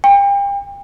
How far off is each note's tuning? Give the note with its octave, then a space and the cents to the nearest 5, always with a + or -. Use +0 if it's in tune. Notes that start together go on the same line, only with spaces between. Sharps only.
G5 +35